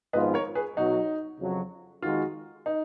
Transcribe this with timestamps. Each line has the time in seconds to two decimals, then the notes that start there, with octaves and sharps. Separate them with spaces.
0.13 G#1 G#2 F3 B3 F4 B4 D#5
0.34 A#4 C#5
0.55 G#4 B4
0.77 B1 B2 F#3 D#4 F#4
1.39 F2 C#3 F#3
2.03 F2 D#3 G#3 D#4 F4 F#4
2.66 D#4